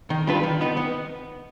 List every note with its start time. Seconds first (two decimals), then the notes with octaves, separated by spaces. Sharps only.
0.10 D#3
0.27 G3 D4 F4 B4
0.43 D#3
0.61 B3 D#4 B4
0.77 B3